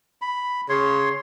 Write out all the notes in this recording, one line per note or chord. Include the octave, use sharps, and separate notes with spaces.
B5
C#3 C#5 C6